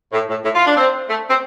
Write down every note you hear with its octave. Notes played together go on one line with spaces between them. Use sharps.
A2
A2
A2
F4
D4
C4
A3
C4